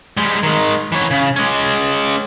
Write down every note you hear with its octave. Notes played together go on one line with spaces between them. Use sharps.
G3 G#3
D#3 G#3
E3 C#5
C#3
G#3 C#4